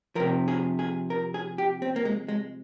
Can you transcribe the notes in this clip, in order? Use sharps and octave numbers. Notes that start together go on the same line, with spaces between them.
C3 F3 A#4
G#4
G#4
A#4
G#4
G4
C4
A#3
G#3
G#3